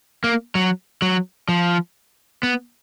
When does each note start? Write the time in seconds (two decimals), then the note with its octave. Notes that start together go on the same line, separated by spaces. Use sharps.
0.24 A#3
0.55 F#3
1.02 F#3
1.49 F3
2.43 B3